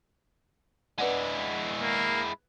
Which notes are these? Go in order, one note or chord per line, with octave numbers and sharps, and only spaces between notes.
G#3 E4 B4 D5 F#5
A#3